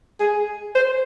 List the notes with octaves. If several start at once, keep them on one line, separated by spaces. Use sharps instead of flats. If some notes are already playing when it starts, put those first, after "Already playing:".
G#4
C5